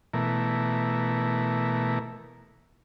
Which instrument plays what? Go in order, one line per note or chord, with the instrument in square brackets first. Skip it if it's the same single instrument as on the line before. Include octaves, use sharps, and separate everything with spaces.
[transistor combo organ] B2 E3 A3 A#4